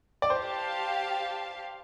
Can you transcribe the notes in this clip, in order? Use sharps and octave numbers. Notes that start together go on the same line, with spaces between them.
D5
G4 C5 F5 A5